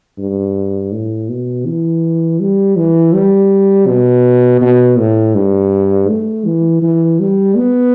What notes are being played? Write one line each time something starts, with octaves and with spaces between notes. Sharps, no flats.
G2
A2
B2
E3
G3
E3
G3
B2
B2
A2
G2
A3
E3
E3
G3
B3